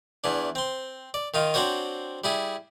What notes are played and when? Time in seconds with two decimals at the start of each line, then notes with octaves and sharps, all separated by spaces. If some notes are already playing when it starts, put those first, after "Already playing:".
0.24 E2 E3 D4
0.55 C4 C6
1.14 D5
1.34 D#3 D#4 F4
1.54 C4 D4 F#4 C5 C#5
2.24 G3 E4 G#4